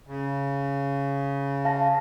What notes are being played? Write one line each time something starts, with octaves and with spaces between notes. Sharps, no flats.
C#3
F5 A5 A#6